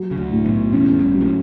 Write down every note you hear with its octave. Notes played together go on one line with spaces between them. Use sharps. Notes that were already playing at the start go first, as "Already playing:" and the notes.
Already playing: F#3
C#3
D2 D3
A2
B1 B2
E2 C#4
G1 G2
F#3
A2